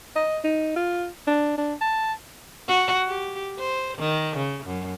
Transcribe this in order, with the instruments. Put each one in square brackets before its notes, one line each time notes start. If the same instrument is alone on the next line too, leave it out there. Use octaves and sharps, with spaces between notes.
[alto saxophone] D#5
D#4
F4
D4
D4
A5
[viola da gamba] F#4
G4
C5
D#3
C#3
F#2